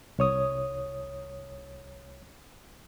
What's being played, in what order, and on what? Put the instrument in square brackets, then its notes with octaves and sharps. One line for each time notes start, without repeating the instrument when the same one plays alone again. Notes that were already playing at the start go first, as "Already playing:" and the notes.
[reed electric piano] C2 C#5 D#6